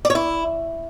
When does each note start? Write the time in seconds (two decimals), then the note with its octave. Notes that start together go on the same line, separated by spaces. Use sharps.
0.05 D5
0.10 C#5
0.15 E4